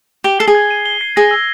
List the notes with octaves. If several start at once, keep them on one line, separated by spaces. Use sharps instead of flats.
G4 G7
A4 C7
G#4
G#6
D#7
G7
C7
G#4 A#6
E6